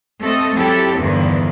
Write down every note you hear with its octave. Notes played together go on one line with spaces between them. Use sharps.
A3 C4 A4 D#5
F#3 C4 E4 G4 A4
E2 G2 D3 D#3 F3